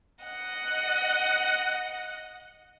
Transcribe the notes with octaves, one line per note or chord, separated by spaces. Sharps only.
D#5 F#5